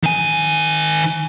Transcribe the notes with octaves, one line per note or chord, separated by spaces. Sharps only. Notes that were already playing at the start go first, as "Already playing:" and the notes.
D#3 G#5